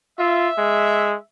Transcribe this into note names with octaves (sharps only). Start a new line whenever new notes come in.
F4 E5
G#3